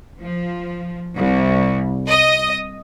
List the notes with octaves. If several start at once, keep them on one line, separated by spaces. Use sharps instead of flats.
F3
C2
D#5